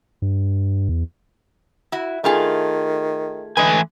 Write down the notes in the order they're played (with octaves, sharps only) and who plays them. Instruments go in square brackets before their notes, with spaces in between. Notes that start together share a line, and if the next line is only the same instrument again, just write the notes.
[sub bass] G2
E2
[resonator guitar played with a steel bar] E4 F#4
[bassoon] D#3 [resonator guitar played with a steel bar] A3 F4 G#4
[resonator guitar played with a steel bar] D3 G#3 B4 [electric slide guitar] E3 A3 G#5